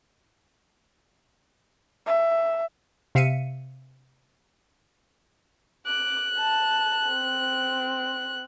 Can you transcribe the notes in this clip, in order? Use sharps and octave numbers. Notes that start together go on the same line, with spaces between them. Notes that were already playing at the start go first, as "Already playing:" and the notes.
E5
C3 E5 F5 B6 C#7 D#7
D6 F#6
A5
C4